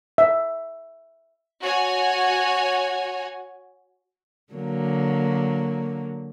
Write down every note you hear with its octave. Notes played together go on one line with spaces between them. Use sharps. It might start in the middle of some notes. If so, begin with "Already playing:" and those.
E5
F#4 C#5 G#5
D3 F#3 A#3